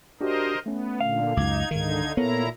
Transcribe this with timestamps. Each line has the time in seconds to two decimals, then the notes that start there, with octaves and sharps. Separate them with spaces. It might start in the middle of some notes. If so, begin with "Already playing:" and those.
0.21 D4 F#4 G4 A#4 C5 D#5
0.66 A3 B3 C#4
1.01 A#2 D3 F5
1.37 C#2 F#2 D#4 D6 G#6
1.71 C#2 G#2 D3 D#3 D#4 G#6
2.17 A#2 B3 E4 A4 A#4 C#5 A#5